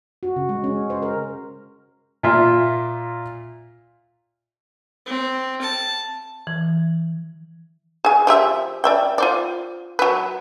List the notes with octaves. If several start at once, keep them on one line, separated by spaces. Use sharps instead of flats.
F#4
C#3
G#3
C#4
C5
A#4
A#2 F4 E5
C4
A5
E3
G#4 G#5
F3 G4 E5
D5 E5 G5
F4 C5 D5
F#3 B4